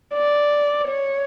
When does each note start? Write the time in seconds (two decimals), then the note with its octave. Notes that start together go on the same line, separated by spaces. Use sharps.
0.14 D5
0.88 C#5